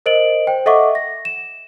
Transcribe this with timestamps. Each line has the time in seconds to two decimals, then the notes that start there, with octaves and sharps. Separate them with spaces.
0.06 A#4 C5 D#5 D7 F#7
0.47 C5 G5
0.66 A4 D#5 E5 F#5 C#6 D6
0.95 A#6
1.25 E7